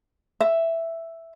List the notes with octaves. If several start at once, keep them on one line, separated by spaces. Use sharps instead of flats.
E5